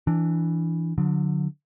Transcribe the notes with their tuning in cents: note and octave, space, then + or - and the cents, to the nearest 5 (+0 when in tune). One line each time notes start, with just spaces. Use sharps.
E3 +0 D4 +0
D3 +0 F#3 -35